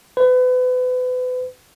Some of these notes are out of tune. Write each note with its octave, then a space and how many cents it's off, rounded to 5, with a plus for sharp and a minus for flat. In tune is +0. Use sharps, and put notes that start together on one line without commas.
B4 +35